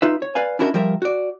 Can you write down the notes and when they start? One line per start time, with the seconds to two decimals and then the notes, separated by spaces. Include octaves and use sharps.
0.02 D#4 F4 B4 E5
0.22 C#5
0.35 B4 D5 F5 G#5
0.59 C#4 D4 E4 F#4 A#4 D#5
0.74 F3 G3 A#4 E5
1.02 F#4 D5